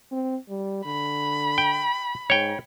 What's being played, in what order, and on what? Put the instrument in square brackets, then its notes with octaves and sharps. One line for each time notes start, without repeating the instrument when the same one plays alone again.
[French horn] C4
G3
[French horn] D3 [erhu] B5
[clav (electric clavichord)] G5
[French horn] G#2 [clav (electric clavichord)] C#5 G5